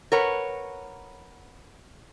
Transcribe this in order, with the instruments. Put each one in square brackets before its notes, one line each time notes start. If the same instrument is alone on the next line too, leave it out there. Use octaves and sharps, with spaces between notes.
[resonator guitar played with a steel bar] A#4 B4 C#5 F#5